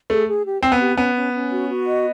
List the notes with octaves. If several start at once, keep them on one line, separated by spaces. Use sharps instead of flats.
A3 G#4
G#4
G4
C4 C5
B3
G4
B3 C#4
C#4
C#4
F#4
F#4
D#5